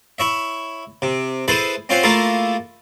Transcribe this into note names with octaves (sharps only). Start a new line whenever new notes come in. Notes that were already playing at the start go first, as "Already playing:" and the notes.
E4 C#5 E5
C3
E4 G#4 A4 B4 C5
C4 C#4 F4 C5 C#5 F#5
A3 A#3 E4 F4 G#4 A4